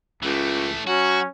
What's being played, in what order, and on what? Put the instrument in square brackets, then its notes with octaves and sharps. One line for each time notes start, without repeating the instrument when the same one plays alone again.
[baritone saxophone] C#2 [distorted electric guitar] E3 A3
[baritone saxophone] F#3 [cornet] C#4 [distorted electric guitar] F#4